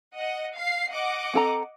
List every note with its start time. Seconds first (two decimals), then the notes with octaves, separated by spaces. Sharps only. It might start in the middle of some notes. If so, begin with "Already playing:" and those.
0.16 D#5 F#5
0.56 F5 C7
0.90 D#5 F#5 D6
1.34 C4 A4 A#5